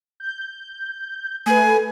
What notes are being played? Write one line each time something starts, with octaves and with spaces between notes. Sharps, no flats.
G6
A3 B4 G#5